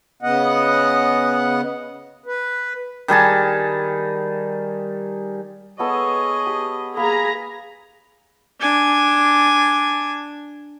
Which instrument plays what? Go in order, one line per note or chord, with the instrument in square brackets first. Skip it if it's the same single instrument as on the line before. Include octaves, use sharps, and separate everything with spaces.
[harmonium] C#3 B3 D#5 F#5
B4
[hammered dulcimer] D#3 G3 G#4 A5
[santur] B3 A4 E6 [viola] G#4 D#5 [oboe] C#5
[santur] G4
[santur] A#3 [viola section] G#4 A#5 [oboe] B5
[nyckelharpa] D4 G#5